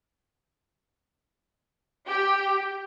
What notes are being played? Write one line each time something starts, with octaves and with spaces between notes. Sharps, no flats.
G4